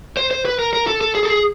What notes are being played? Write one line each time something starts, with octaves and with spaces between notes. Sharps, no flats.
C5
C5
B4
A#4
A#4
A4
A4
G#4
A4
G#4